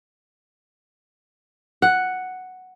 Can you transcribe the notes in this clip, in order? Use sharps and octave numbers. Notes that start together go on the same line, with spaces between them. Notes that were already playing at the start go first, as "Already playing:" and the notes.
F#5